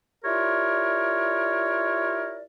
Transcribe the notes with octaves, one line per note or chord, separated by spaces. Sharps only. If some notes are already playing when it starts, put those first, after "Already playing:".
E4 F4 G4 A#4 C#5 D5